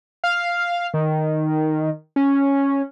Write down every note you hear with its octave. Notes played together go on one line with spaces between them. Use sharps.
F5
D#3
C#4